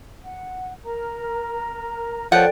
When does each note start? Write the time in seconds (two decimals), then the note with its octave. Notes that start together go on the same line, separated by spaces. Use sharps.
0.23 F#5
0.84 A#4 A#5
2.32 F3 A4 A#4 C#5 D5 F#5 G5 A5